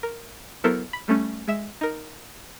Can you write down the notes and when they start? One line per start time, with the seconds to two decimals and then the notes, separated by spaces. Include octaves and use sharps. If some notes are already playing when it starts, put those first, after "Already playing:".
0.03 A#4
0.64 F#3 B3 E4 A4 A#4 C5
0.93 B5
1.08 G3 A3 C#4
1.48 G#3 E5 E6
1.81 D#4 A#4